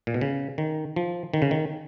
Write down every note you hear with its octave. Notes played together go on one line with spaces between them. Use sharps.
A#2
B2
C#3
D#3
F3
D#3
C#3
D#3